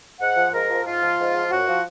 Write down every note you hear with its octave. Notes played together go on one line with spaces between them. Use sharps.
G#2 F#5
F3
G#2 A#4
F3
G#2 F4
F3
G#2
F3
F#2 F#4
F3